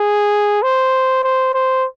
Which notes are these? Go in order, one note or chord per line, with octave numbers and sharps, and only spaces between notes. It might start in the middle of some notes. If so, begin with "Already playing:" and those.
Already playing: G#4
C5
C5
C5